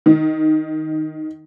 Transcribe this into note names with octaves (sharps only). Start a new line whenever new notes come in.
D#3